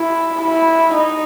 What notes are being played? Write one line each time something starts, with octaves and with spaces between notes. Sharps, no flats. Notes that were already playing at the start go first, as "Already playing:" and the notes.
Already playing: E4
E4
D#4